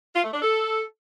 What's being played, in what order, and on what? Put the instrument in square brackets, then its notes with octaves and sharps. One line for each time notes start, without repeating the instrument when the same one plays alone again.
[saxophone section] F4
A3
D4
A4